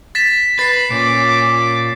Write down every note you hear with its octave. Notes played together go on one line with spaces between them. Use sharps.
A6 B6 E7
B4 A6 C7
A#2 C#4 D6